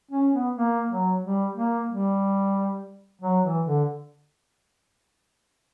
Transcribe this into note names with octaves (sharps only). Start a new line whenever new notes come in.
C#4
B3
A#3
F#3
G3
A#3
G3
F#3
E3
D3